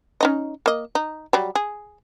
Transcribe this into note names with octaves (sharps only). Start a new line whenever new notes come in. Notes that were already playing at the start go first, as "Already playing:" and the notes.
C#4 D#4 D#5
A#3 D#5
D#4
F#3 G3
G#4